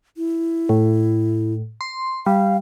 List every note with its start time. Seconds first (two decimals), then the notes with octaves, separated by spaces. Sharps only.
0.17 E4
0.69 A2
1.81 C6
2.26 G3 F5